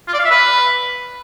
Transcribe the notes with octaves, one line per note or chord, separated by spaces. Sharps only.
F4
D5
F5
E5
B4